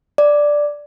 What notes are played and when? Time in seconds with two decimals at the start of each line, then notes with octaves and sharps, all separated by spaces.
0.18 D5